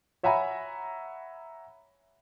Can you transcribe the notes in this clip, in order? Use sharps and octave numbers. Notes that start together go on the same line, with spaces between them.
C#5 E5 F#5 G#5 A#5 B5